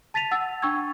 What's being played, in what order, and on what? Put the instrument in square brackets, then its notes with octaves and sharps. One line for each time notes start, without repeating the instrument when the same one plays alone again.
[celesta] A5 A6 B6 D#7 F7
F#5 E6 A6
D4 G5 C#6 E6 G#6